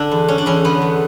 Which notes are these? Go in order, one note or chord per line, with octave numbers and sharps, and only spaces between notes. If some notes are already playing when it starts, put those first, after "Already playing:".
Already playing: D3 D4
E2
D3 C#4
D4
E2 C#4
D3 B3
E2